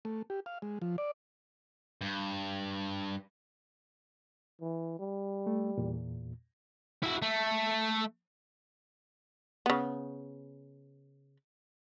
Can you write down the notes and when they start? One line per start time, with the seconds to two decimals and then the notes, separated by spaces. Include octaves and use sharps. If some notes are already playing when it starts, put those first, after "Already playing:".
0.05 A3
0.30 G4
0.46 F5
0.62 G#3
0.82 F3
0.98 D5
2.01 G2
4.61 E3
4.99 G3
5.47 A3
5.78 E2 A#2
7.03 E4 F#4
7.22 A3
9.66 C#3 B3